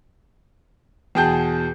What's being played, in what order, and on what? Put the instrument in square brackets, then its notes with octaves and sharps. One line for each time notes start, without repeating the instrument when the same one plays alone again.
[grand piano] E2 B2 G#4 G5 A5 G6